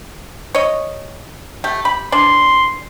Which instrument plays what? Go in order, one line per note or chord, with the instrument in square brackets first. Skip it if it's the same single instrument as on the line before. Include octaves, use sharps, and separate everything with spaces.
[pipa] C#5 D#5
A3 G4
G4 B5
[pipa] E3 D4 D5 [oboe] C6